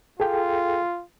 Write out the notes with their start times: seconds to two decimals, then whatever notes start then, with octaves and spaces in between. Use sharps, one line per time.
0.20 F4 G#4 A4 G5